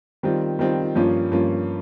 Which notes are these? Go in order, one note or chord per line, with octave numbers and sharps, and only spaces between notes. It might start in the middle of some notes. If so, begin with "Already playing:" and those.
D#3 G3 C4 F4
D#3 G3 C4 F4
G2 F3 A#3 C#4 F4
G2 F3 A#3 C#4 F4